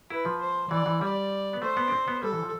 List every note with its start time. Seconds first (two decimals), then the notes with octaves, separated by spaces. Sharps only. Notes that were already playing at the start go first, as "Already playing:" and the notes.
0.10 E4 B4
0.25 F3
0.41 C5
0.71 E3 D5
0.86 E3
1.01 G3 D5
1.53 B3
1.62 A3 C5
1.77 B3
1.88 D4
1.92 C4
2.08 B3
2.23 G3 A4
2.33 E3
2.43 F3